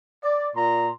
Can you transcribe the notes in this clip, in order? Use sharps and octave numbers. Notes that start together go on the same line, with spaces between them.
D5
A#2 A#5 C6